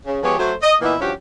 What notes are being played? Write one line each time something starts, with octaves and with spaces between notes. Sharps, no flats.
C#3
F3 G#3 B3 G4 G#4 C#5
F#3 A3 C5
D#5
A#2 E3 A#3 B3 D#4 E4
G2 F3 C#4 F#4 G4